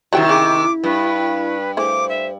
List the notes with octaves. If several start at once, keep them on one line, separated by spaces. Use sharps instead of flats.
C3 D#3 F#3 G3 E4 G5
C#3 D6
G2 B4
A3 E4 G#4 C5 D6
E5